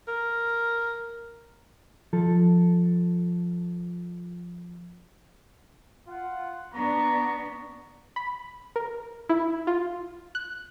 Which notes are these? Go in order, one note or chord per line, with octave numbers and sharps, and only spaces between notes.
A#4
F3 A4
F4 F#5
B3 D4 A#5 C#6
B5
A#4
E4
F4
F#6